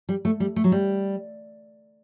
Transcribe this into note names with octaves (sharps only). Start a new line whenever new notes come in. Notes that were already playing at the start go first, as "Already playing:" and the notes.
G3
A3
G3
A3
F#3
G3